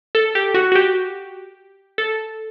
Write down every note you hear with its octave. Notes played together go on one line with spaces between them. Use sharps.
A4
G4
F#4
F#4
G4
A4